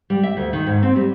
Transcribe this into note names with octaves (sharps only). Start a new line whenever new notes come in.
G3
E5
D2
D#3
G#2
C4
G3